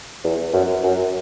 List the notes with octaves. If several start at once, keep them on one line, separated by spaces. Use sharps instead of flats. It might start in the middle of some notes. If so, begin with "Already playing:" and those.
E2
F#2
F#2